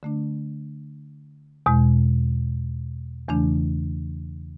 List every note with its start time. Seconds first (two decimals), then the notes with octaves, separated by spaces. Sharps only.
0.03 D3 A3 D4
1.66 E2 B2 G#3
3.28 E2 C#3 E3 A3 D4